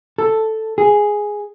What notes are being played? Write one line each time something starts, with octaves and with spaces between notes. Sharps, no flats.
A4
G#4